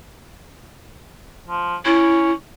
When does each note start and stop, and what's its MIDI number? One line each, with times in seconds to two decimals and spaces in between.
1.48 1.76 53
1.86 2.33 61
1.86 2.32 64